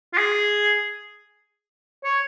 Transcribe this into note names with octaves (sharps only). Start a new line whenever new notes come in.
F4
G#4
C#5